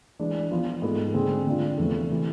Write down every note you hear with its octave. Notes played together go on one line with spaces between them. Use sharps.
E3 G#3 D4
F3 B3 F4
G#2 G#3 B3 F4 A4
D3 G#3 C4 G#4
D3 G#3 D4 F4
E2 C3 F3 A3
C3 E3